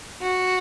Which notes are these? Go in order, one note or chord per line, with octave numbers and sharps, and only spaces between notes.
F#4